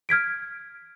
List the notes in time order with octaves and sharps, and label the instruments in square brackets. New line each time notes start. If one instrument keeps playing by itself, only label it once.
[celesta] F6 G#6 B6 D7